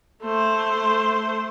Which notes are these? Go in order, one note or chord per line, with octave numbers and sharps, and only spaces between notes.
A3 C5